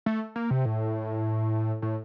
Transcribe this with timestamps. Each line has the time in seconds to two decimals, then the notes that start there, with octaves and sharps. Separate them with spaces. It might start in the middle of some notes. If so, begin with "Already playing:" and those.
0.06 A3
0.36 A#3
0.50 C3
0.65 A2
1.82 A2